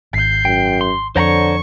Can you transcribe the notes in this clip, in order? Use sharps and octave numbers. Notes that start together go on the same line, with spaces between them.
G#1 G6 C7
F#2 G5
C6
F2 D3 C5 C#5 A#5 C#6